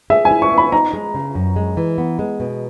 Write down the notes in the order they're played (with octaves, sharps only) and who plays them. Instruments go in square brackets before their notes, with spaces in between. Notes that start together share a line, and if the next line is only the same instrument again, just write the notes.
[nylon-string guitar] G#4 [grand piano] E5
[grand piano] G#5
[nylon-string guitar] E4
[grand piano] C#6
[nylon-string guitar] B3
[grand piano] B5
[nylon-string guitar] D#4 [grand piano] A#5
[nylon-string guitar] G#3
C#3
F#2
G#3
E3
B3
G#3
B2